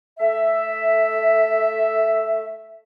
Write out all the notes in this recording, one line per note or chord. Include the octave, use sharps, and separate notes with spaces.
A3 A4 E5